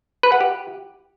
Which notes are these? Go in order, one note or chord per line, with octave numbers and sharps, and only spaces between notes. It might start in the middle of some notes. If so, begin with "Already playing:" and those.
B4
F#5
G4